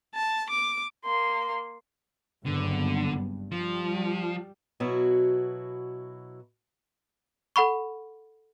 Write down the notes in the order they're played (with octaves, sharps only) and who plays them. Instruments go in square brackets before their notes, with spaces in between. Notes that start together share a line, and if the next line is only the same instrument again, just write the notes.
[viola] A5
D6
[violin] A#3 C6
[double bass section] F#1 G2 B3 [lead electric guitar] D3
[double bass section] G2
[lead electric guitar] F3 [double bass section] G3
[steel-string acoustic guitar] B2 F#3 E4 F#4
[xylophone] A4 F#5 B5 C#6